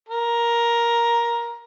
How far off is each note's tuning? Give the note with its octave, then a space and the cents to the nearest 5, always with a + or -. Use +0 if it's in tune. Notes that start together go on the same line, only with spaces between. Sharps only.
A#4 +10